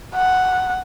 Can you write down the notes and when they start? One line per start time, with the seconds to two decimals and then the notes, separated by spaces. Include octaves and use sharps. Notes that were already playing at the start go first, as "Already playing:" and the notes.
0.15 F#5